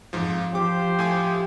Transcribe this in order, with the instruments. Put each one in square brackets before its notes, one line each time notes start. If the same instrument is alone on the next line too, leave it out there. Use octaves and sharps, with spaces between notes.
[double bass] F2 [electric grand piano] G#2 F3
[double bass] F3 [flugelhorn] G4 [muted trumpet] C5 [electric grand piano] D6
[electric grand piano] A2 G#5 D6